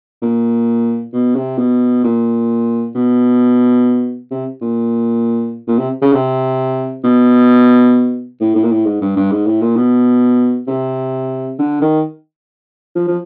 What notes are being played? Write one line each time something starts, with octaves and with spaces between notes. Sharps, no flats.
A#2
B2
C3
B2
A#2
B2
C3
A#2
A#2
C3
C#3
C3
B2
A2
A2
A#2
A2
G#2
G2
G2
G#2
A2
A#2
B2
C3
D3
D#3
F3
F3